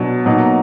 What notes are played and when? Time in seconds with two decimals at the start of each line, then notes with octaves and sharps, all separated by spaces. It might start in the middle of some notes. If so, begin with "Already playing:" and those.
Already playing: B2 F#3 D4
0.25 B2 F#3 A#3 D#4